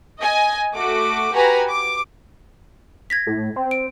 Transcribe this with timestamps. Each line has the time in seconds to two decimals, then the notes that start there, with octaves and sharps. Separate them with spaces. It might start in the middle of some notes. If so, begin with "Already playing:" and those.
0.20 D#5 G#5
0.75 A3 F#4 D6
1.32 F#4 G4 B4 G#5 A#5
1.69 D6
3.10 G#6 A#6 B6
3.27 A2
3.56 C4
3.71 D7